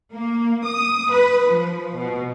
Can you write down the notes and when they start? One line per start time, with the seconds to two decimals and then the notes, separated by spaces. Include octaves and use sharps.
0.13 A#3
0.65 D#6
1.10 B4
1.49 F3
1.96 B2